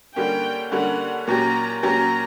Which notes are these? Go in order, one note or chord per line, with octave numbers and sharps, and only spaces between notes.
D3 G3 A#3 C#4 G5
D3 G3 A#3 C#4 F#5
A#2 F#3 C#4 G4 A#5
A#2 F#3 C#4 G4 A#5